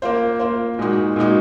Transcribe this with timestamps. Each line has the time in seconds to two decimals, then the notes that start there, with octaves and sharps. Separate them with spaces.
0.02 A#3 F4 C5
0.40 A#3 F4 C5
0.79 A#2 G#3 D#4 F#4
1.16 A#2 G#3 D#4 F#4